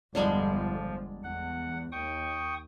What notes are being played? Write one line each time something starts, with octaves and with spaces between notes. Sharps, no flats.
G1 E2 D3 F3 G3 G#3 D5 A5
E2 F#5
D#2 G5 C#6 D#6